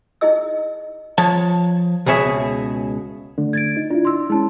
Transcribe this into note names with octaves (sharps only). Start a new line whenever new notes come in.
D#4 E4 G#4 D#5 E6
F3 C#5 A5
C#2 B2 G#4 C#5 E5
D3 A3 D4
G#6 A6 D7
D#4
D4 E4 F4
C6 E6
G#3 C#4 E4 A5